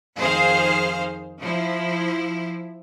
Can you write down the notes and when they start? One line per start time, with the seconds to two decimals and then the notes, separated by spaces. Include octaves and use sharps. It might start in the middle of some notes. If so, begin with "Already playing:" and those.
0.18 F2 D#3 G#4 C5 F5
1.40 F3 E4